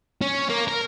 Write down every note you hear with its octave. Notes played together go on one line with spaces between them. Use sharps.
C#4
A#3
A#4